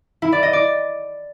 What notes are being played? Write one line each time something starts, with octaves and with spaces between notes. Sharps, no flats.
E4
D5
D#5
D5